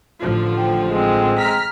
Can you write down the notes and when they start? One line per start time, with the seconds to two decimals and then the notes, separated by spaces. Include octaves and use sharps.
0.20 A1 D3 F3
0.57 G5
0.91 G#3 C4
1.39 A#5 F6 B6